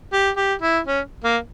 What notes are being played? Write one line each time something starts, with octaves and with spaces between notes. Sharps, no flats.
G4
G4
E4
C#4
A#3